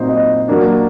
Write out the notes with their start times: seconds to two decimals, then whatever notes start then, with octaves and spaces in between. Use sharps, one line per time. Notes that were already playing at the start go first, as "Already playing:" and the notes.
Already playing: A#2 F#3 C4 D#4 C5
0.09 D#5
0.48 F#3 A#3 D4